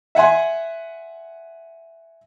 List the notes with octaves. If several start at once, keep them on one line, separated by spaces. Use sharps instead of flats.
E5 F#5 G#5 C6